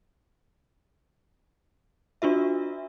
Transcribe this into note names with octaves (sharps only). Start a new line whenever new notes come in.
D4 F4 F#4 E5